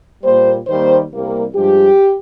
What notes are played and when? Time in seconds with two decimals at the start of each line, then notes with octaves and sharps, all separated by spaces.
0.23 A#2 G3 A#3 C5
0.66 D#2 D#3 G3 A#3 C5
1.10 C2 C3 G3 A#3
1.53 G2 F3 G#3 G4